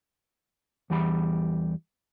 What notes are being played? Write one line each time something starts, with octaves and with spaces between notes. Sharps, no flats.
E2 E3 G3 G4 A#5 B5